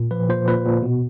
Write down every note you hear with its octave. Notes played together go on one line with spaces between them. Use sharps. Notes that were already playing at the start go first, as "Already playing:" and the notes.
Already playing: A#2
F3 B4
A#2 C5
A#2 B4
A#2
B2